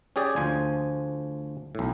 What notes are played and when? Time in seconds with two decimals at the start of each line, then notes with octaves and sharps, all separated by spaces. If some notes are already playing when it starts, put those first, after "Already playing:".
0.16 C#4 G4 G#4 D5
0.36 D2 F3 C5 G#5
1.75 B1 A2